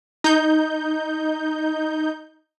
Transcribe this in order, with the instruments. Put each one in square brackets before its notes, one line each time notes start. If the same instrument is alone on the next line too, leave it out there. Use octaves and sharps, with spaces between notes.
[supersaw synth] D#4 G6